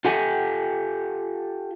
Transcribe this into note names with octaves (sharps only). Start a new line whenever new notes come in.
F4 G4 A4 F#5 G#5